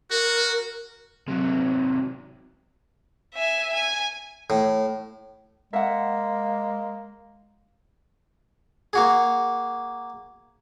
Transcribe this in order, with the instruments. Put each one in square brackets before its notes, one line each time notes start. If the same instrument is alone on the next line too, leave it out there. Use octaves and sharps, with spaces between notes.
[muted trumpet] F#4 [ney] A#4
[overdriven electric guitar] C3 F#3
[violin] E5 G#5
G#5
[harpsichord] A2
[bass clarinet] G#3 [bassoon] A#3 [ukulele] E5 F#5
[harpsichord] A#3 F#4 G#4